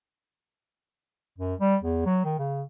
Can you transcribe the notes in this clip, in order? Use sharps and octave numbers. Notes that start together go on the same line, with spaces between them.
F#2
G3
E2
F#3
D#3
C#3